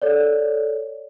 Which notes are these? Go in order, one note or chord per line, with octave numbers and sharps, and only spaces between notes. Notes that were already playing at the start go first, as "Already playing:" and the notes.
A4 C#5 D5